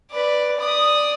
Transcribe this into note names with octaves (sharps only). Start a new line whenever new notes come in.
B4 D5
D5 D#6